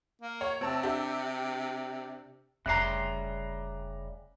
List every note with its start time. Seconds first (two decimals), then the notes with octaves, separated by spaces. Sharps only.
0.21 A#3
0.41 C#5
0.61 C3 C4 A5 E6
0.83 D4 G4 E5
2.66 F1 C#3 G3 E5 A#5 C6 F#6